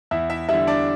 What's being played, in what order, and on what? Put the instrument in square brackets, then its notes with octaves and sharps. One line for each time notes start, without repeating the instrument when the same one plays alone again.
[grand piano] E2 E4 E5
E4 E5
D3 G3 E4 E5
D4 D5